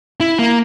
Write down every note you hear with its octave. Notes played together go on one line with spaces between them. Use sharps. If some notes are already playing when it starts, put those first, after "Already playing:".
E4
A#3